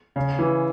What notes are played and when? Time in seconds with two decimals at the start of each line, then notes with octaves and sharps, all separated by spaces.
0.16 C#3
0.39 E3